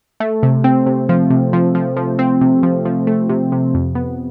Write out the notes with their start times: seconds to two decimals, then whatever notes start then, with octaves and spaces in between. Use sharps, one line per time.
0.20 A3
0.43 C3
0.64 C4
0.86 C3
1.09 F3
1.30 C3
1.53 F3
1.75 F3
1.97 F3
2.19 C4
2.41 C3
2.63 F3
2.85 F3
3.07 A3
3.29 C3
3.52 C3
3.74 F2
3.95 B3